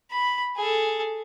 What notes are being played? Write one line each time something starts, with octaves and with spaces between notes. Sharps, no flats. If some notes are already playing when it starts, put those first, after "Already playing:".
B5
G#4 A4